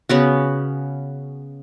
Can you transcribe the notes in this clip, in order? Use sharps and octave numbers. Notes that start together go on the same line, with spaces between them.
C#3 B3 F#4